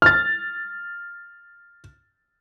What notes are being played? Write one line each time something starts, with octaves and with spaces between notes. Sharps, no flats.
F6 A6